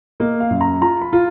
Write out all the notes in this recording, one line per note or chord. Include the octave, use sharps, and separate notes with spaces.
A#3 D#5
F5
F#2
A#5
F4 A#5
B5
F4